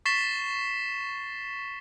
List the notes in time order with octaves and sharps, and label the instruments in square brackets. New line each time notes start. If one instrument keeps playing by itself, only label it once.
[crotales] C#6 A6 B6 C7 E7 G7